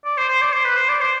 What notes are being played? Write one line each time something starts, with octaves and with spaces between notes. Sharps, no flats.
D5
C5
C5
D5
C5
B4
C5
D5
C5